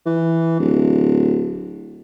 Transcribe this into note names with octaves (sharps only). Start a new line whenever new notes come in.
E3
D1